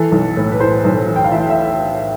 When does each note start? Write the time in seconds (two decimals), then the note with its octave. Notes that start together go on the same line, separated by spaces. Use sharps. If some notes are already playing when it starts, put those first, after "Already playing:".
Already playing: E3 A4
0.12 B1
0.37 A2
0.52 B4
0.60 A2 C5
0.85 B1
1.08 E3
1.16 G5
1.24 F5
1.32 E3 E5
1.50 E5